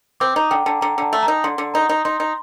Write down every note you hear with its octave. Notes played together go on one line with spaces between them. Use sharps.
C4 D6
D#4 A#5
D3 G5
D3 A5
D3 A#5
D3 A5
A3
A#5
D#4
D3 C6
D3
D#4 A#5
D#4
D#4 C6
D#4